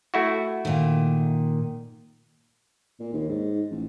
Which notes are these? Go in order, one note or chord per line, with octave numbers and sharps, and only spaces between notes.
A3 E4 F#4
A#2 D#3
A#2
D#2
G#2
A1